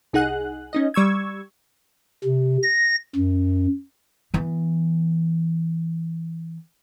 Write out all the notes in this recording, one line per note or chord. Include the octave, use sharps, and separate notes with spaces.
C2 D#4 G#4 F#5 F#6
C#4 D#4 D#5
G3 C#6 E6 G#6
C3
A#6
F#2
E3 B3